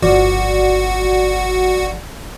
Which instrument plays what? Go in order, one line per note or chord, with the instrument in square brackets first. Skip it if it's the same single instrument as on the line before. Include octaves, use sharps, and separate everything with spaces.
[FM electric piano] G1 F3 D5 [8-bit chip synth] F#4